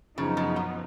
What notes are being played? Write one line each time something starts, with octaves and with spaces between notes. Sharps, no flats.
F#2 C#3 F3 B3 D#4
C#3
B2